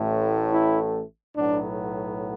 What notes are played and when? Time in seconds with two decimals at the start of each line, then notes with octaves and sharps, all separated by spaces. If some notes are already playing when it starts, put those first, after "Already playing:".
Already playing: A1 A2 A3
0.53 E4
1.36 B1 A2 F#3 B3 D4